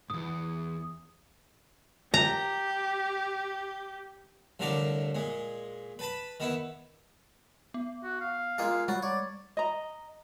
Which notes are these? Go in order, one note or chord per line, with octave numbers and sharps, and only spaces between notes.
E2 G#2 D#6
G4 A#5
C2 A2 D3 F3 A#4 D5
A#2 G#3
B4 A5 B5
D#3 B3 E4
B3
F#4
F5
G#3 A#3 F4
G3 G#3 F#4 A6
C#5 D5
D#5 A#5